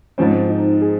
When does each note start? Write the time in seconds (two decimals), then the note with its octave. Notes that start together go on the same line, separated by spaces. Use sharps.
0.18 G#2 F3 C4 C#4
0.50 D#4
0.82 G#4